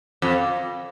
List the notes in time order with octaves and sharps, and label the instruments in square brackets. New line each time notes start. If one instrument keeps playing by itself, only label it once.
[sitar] F2